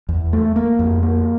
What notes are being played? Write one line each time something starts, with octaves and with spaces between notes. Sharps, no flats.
E2
A3
A#3
F2
A#3